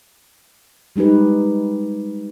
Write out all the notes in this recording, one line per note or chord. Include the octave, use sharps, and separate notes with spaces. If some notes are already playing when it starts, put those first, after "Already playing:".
G3 G#3 D#4 G4 B4